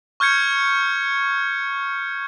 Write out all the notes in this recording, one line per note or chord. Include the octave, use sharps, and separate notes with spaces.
C#6 F6 G6 G#6 C#7